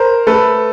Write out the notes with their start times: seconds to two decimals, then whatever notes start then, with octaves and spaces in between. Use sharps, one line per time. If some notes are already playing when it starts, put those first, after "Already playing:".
Already playing: A#4 C5
0.27 A3 A4 B4